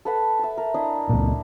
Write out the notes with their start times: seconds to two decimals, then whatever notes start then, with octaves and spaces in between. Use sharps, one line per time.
0.05 A4 B4 F#5
0.39 E5 A5
0.57 A#4
0.74 D4 E4 D#5
1.09 C#2 A#2